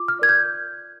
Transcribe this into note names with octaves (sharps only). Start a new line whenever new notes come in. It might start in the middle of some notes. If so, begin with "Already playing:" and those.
Already playing: F4 D6
F6
A#4 D5 G#6
G6